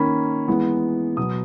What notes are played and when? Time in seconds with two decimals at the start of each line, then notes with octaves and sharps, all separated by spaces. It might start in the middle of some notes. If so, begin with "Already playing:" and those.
Already playing: D#3 A#3 C#4 B5
0.48 E3 G#3 B3
1.17 B2 F#3 B3 D#6